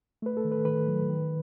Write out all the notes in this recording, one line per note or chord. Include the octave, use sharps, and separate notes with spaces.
A3 B4
A4
D#3
B4
D#3 B4
F#3
D#3